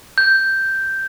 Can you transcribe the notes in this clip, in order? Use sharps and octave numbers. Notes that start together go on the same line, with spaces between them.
G6